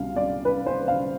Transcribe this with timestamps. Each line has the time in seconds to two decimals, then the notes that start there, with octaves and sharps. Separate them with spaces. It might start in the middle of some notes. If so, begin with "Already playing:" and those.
Already playing: C2 B2 G3 F5
0.16 D5
0.45 B4
0.66 C5
0.88 F5